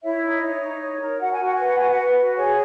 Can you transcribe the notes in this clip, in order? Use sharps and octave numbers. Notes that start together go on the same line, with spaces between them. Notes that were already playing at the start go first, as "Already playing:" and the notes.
E4 C#5 E5
D#4
C#5
D#4
C#5
A#4
F#4 F#5
G#5
F#4 F#5
B4 G#5
F#5
F#4 G#5
F#4 F#5
B4
F#4
G#4 C#5 G#5